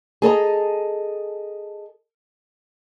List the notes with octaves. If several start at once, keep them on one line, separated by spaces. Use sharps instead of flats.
G#4 A4 D#5 A#5